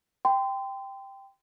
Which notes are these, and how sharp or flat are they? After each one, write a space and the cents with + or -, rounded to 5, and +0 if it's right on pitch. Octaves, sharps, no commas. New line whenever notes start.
G5 +5 C6 -30